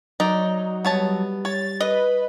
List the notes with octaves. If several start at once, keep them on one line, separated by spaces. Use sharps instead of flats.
F#3 D#4 D5
G3 B3 C#5 A5
C#5 A6
B4 D#5